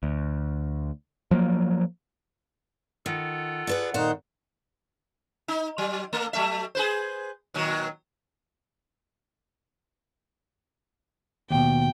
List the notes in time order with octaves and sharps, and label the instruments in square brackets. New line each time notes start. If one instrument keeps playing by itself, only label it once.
[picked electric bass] D2
F3 F#3 A#3
[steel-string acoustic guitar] D#3 [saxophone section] F4 A4 F#5
[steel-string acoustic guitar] G#4 B4 D5
[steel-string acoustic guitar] A#2 C5 C#5 [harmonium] D#3 D#4 F#5
[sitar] D#4
F#3
A3 A#3
F#3 A3 E5
G#4 B4 C5
A#2 D#3 F#3
[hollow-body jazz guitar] D#2 B2 [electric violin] G5